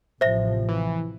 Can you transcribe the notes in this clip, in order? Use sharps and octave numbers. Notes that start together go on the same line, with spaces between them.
A1 C3 F3 C5 E5 A#6
E3